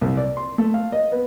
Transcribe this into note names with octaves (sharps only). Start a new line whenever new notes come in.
C2
D5
C6
A3
F5
D#5
B3